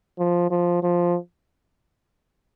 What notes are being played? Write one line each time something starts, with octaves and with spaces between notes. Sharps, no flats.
F3
F3
F3